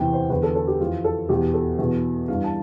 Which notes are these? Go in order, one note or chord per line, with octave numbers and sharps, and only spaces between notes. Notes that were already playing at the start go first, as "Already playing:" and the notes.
Already playing: E2 C3 E3 G5
C5
E2 D3 B4
A4
A4
G4
F2 E3 F4
A4
E2 B2 G4
A4
E2 B2
G2 E3 F5
A5